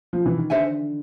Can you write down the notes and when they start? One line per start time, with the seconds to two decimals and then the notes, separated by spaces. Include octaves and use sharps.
0.13 F3
0.26 E3
0.38 D#3
0.50 D3 A4 C5 E5 G#5